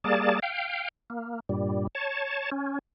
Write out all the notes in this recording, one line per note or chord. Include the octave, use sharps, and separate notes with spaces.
G3 A#3 G#4 D5 A5
F5 G5
A#3
G2 A#2 G3
C#5 A5
C#4